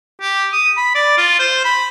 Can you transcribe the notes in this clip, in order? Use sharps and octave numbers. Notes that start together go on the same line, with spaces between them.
G4
D#6
B5
D5
F4
C5
B5